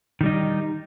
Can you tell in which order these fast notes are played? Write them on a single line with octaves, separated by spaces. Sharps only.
D#3 G3 D#4